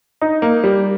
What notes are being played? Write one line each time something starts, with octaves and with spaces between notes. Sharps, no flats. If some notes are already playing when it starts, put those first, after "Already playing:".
D#4
A#3
G3